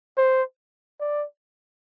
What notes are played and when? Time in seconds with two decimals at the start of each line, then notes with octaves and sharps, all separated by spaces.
0.18 C5
1.00 D5